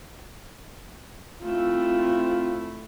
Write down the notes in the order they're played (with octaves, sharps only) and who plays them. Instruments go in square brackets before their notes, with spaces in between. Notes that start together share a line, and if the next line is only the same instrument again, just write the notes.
[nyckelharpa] A3 E4 [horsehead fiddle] C4 F4